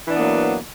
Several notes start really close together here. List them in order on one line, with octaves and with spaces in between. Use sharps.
E3 D4 B3 A#3 F#3